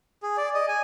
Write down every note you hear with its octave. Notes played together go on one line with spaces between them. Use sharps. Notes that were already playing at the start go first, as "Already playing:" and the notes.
G#4
D5
D#5
G#5